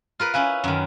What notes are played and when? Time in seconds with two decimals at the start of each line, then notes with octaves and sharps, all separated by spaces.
0.20 F4 A#4 B4 F6
0.34 C#4 E4 B4 F5 G#5
0.64 F#2 D#3